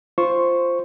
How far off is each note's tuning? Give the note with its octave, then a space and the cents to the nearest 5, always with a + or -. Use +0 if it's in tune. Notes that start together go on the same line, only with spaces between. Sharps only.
F4 -10 C5 +0 C#6 +0